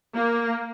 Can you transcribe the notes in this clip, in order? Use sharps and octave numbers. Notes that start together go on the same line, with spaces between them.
A#3